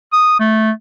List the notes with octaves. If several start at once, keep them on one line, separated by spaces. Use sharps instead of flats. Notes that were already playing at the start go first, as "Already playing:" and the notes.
D#6
A3